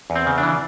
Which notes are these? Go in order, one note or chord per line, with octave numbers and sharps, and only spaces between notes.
E2
C4
C#3
D4
E3